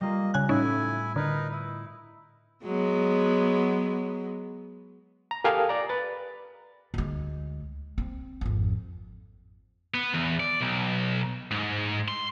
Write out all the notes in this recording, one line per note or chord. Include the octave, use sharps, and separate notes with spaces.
G3 A#3 F4 D#5
C#3 G#5 F#6
A2 C#4 D#4 E4 G#5
D3 D#4 A#4 B4
E4 D#6
F#3 G#3 B3
A#5
G4 A4 A#4 F5 G#5 D#6
D5 A#5
B4 A6
D2 G#3
C4
G#1 F2
B3
E2
D5
B1
G#2
C6